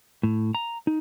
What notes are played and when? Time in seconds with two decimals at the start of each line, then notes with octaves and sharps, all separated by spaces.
0.23 A2
0.55 A#5
0.87 D#4